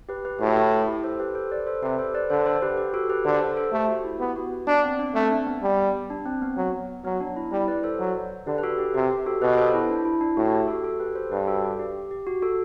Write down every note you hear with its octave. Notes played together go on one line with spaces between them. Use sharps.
G4 B4
G4 B4
A2 F#4
E4
E4
G4
A4 C5
G4 B4
A4 C5
B4 D5
A4 C5
C3 G4 B4
A4 C5
B4 D5
D3 A4 C5
A4 C5
G4 B4
G4
F#4 A4
G4 B4
D3 A4 C5
A4 C5
A4 C5
A3 G4
F#4
E4
B3 G4
F#4
B3 D4
C4
D4
A3 C4
D4
B3
G3
D4
C4
B3
F#3
F#3 B3
D4
E4
G3 E4
B4 D5
A4 C5
F#3
D3 G4 B4
B4
F#4 A4
G4
C3 G4
G4
F#4 A4
B2 G4 B4
A4 C5
E4
D4
E4
D4
A2 F#4
G4
F#4 A4
F#4 A4
G4 B4
A4 C5
G2 G4 B4
F#4 A4
G4
G4
G4
F#4
F#4 A4